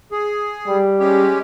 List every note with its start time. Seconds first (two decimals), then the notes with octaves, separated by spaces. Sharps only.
0.11 G#4
0.68 G3
1.00 G#3 C#4 G4